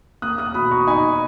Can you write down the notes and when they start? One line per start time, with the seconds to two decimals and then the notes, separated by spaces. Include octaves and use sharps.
0.22 A#3 D#6 F#6
0.38 D#6 F#6
0.54 B2 B5 D#6
0.71 A#5 C#6
0.87 D#4 G#5 B5